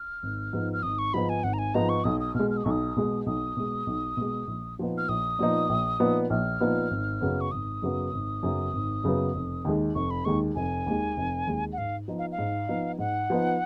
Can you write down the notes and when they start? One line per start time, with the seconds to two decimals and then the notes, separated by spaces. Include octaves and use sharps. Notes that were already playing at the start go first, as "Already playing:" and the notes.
Already playing: F6
0.23 G#1
0.53 G#2 F3 B3 D#4
0.73 F6
0.83 G#1 D#6
0.99 C#6
1.14 G#2 F3 B3 D#4 B5
1.29 G#5
1.44 G#1 F#5
1.53 A#5
1.59 G#5
1.74 G#2 F3 B3 D#4 A#5
1.89 C#6
2.04 B1 D#6
2.20 D#6
2.34 B2 G#3 F6
2.50 F6
2.57 D#6
2.64 B1 C#6
2.71 D#6
2.96 B2 G#3
3.26 B1 D#6
3.57 B2 G#3
3.87 B1
4.17 B2 G#3
4.47 A#1
4.78 A#2 F3 B3 D#4
4.98 F6
5.08 A#1 D#6
5.39 A#2 F3 B3 D#4
5.69 A#1
6.00 A#2 F3 B3 D#4
6.30 A#1 F6
6.60 A#2 F3 B3 D#4
6.91 G#1
7.21 F#2 C#3 F#3 B3
7.41 C#6
7.51 G#1 D#6
7.82 F#2 C#3 F#3 B3
8.13 G#1
8.43 F#2 C#3 F#3 B3
8.73 G#1
9.04 F#2 C#3 F#3 B3
9.35 F1
9.65 D#2 D#3 G#3
9.95 F1 C#6
10.11 B5
10.25 D#2 D#3 G#3 C#6
10.55 F1 G#5
10.86 D#2 D#3 G#3
11.17 F1
11.47 D#2 D#3 G#3
11.73 F#5
11.78 G#2 F5
12.08 F3 B3 D#4
12.19 F5
12.32 F5
12.38 G#2
12.68 F3 B3 D#4
12.99 G#2 F#5
13.30 F3 B3 D#4